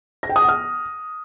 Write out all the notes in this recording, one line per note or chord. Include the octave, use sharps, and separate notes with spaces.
A#6
G5
D#6
F#5
F6